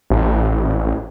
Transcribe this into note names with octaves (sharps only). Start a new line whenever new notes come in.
A1